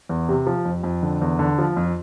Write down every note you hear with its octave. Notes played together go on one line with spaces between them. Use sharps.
E2
C3
F3
F2
F2
D3
E2
D3
F3
F2